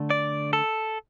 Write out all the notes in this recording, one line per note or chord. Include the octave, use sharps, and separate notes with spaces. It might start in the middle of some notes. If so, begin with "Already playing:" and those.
Already playing: D3 A3
D5
A4